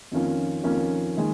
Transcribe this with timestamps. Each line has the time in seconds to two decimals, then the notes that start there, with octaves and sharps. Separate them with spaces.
0.11 F2 D#3 A#3 C#4 F4
0.63 F2 D#3 A#3 C#4 F4
1.17 D#3 G#3